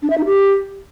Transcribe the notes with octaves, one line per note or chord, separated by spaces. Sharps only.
D4
E5
D#4
G4